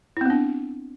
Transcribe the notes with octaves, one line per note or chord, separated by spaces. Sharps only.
B3 C4 D4 E4